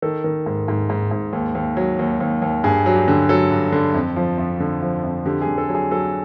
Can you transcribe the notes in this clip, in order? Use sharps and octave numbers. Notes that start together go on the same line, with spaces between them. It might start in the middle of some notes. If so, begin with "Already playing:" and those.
D#3 A4
D#3
G#2
G#2
G#2
G#2
D#2
D#2
F#3
D#2
D#2
D#2
G2 G#4
F#3
G4
D3
F#3 A4
G2
D3
F2
F3
F2
D3
F3
F2
D3 G4
G#4
D3
A4
F#3
G#4
F#3 A4